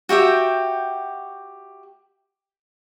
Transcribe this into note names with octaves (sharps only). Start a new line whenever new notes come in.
F#4 G4 E5 G5